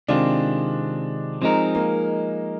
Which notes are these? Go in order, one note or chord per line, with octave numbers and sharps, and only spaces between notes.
C3 D#3 G#3 C4 D4 F4
F3 G#3 C4 D#4 A#4
A#3